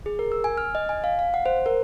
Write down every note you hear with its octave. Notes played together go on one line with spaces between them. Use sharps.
G#4
A#4
E6
G#5
F6
D#5
G#5
F5
F5
F#5
C5
A#4